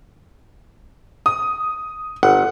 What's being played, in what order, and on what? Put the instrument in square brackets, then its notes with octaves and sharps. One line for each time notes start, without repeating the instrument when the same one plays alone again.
[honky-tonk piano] D#6
[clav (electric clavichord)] G1 [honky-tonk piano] F#5